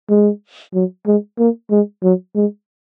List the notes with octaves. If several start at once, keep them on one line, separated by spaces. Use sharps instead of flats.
G#3
F#3
G#3
A#3
G#3
F#3
G#3